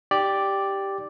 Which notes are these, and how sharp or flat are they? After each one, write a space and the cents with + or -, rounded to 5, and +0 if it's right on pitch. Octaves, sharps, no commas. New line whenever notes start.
D#4 +0 G4 +0 D5 +0